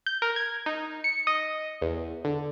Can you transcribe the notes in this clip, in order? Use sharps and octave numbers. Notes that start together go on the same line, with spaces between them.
G6
A#4
G#6
D#4
C#7
D#5
E2
D3